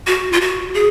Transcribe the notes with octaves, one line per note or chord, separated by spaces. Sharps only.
F#4
F4
F#4
G#4